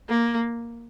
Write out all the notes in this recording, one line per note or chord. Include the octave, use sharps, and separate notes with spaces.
A#3